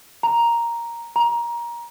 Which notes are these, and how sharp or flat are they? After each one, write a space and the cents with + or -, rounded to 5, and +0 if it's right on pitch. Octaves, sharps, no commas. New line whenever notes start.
A#5 +5
A#5 +20